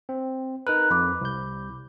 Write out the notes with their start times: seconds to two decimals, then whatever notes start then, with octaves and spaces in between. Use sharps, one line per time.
0.09 C4
0.67 D#4 A#4 B4 F#6
0.90 F2 B5 D6
1.21 C2 G6